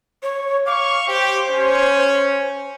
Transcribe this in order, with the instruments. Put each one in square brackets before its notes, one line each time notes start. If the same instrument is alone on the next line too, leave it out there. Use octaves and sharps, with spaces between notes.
[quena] C#5
[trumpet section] F5 C#6 [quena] D6
[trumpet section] G4 [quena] C5
[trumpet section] C#4